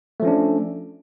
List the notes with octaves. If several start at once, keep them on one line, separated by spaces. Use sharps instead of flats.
F3 A3 C#4 D4